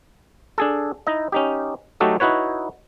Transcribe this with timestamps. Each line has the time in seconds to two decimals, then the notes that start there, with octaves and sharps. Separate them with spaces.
0.58 D4 G#4 A4
1.07 D#4 E4 D#5
1.32 C#4 D#4 G4
2.00 F#3 A3 D#4 F#4 G4 A4
2.20 D#4 E4 F#4 B4 C#5